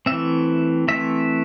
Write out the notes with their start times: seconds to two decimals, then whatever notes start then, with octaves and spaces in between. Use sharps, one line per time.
0.06 E3 A3 C4 E5
0.88 E3 A3 C4 E5